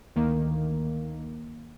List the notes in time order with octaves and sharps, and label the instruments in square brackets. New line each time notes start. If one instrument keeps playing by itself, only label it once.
[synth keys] D2 D#3 A#3